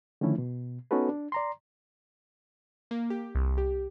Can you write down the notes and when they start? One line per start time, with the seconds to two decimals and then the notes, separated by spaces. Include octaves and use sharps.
0.21 D3 D#3 F3 A3 C#4 E4
0.38 B2
0.91 B3 C#4 D#4 F#4 A4 B4
1.09 D4
1.32 D5 A#5 C6
2.91 A#3
3.10 G4
3.35 C2
3.58 G4